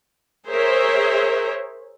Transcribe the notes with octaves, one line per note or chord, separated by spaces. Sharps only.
G#4 A#4 C5 C#5 E5